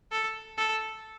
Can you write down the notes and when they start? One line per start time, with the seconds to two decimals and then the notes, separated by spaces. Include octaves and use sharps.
0.12 A4
0.58 A4